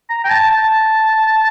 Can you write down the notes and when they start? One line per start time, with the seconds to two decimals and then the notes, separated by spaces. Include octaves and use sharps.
0.09 A#5
0.24 G5
0.29 A5
0.51 A5